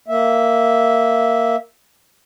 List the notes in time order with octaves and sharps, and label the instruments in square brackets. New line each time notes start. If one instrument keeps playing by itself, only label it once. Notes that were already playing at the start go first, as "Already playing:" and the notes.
[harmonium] A#3 E5